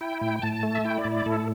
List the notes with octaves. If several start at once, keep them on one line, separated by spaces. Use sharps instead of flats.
E4 G5
A2 G5
A2 A5
A3
E5
E4 G5
D5
A2
D5
A2 A4